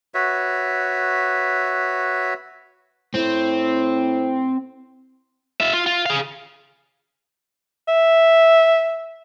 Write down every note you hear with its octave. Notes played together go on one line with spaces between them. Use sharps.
F#4 B4 C#5 E5
A2 C4
F4 E5
F4
F4
G#4 F5
E5